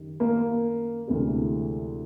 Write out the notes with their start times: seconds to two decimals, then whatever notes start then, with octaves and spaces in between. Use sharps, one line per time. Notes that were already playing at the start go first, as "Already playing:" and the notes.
Already playing: F#2 D#3 G3
0.20 A#3
1.08 D2 C3 E3 G#3